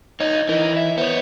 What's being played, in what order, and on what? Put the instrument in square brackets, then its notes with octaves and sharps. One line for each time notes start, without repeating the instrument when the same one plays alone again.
[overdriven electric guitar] D#4 [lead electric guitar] C#5 D#5
[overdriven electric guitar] E3 [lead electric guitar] A#4 D#5
[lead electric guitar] E5
[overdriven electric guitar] B3 [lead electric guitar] C5 C#5